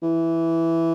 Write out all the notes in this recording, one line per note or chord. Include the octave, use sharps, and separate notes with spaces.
E3